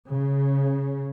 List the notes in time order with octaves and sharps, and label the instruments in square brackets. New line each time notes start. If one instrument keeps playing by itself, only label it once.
[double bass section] C#3